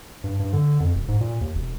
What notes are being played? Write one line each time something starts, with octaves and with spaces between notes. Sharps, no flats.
G2
G2
D3
F2
E1
G#2
A#2
D#2
E1